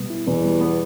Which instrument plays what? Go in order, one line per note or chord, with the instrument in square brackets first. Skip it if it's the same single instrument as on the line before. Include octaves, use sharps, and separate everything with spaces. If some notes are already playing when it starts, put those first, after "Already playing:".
Already playing: [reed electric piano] B2 G3 B3
E4
[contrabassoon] E2 [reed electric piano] B2
[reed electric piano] G3
B3